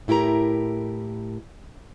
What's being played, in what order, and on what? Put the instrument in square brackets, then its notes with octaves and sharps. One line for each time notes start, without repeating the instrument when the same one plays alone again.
[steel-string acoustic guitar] A2 E4 G4 A#4 A#5